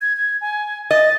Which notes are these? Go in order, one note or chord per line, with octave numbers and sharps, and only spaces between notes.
G#6
G#6
G#5
D#5 A6